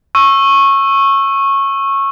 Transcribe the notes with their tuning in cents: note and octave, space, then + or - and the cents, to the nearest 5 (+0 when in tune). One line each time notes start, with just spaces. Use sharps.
C#6 -15 E6 +10